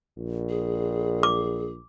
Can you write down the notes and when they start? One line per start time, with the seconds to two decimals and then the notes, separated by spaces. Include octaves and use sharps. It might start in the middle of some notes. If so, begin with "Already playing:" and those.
0.17 A#1
0.49 G#4
1.23 D6